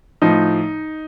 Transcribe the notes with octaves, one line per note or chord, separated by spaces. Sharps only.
A2 F3 D#4